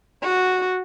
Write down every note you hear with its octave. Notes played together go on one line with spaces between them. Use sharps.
F#4